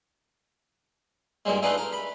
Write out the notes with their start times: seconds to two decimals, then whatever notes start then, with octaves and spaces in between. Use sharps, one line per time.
1.45 G2 A#2 G3 G#3
1.62 A3 D4 D#4 F4 G#4 B4
1.78 A#4
1.93 B5